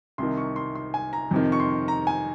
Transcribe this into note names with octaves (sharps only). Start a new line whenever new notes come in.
C2 C3 D#3 C6
C#6
C6
C6
G#5
A#5
F2 C3 D#3
C#6
C6
A#5
G#5